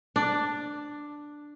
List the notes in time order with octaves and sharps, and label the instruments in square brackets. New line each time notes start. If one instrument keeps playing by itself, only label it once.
[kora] D4